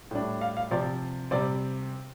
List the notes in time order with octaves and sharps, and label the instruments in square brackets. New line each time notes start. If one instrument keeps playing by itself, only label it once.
[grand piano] A2 G3 D4
F5
F5
C3 F3 C4 D5
C3 G3 C4 D5